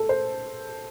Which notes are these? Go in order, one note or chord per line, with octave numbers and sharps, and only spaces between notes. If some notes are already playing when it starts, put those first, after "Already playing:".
Already playing: A4
C5